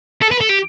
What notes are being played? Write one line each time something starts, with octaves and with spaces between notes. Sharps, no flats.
A4
B4
A4
G4